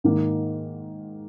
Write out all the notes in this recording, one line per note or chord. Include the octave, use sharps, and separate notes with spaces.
G#2 D#3 A#3